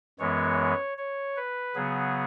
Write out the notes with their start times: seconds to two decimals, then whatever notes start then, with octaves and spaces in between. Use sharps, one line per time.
0.19 F#2 E3 G#3 B3 C#5
0.98 C#5
1.37 B4
1.75 C#3 F#3 B3 G#4